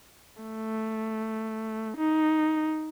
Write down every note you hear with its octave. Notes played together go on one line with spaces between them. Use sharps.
A3
D#4